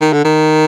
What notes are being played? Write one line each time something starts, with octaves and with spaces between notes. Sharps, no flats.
D#3
D3
D#3